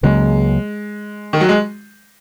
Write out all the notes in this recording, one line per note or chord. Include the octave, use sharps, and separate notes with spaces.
C#2 C#3 F#3 G#3 A#3
D#3
F#3
G#3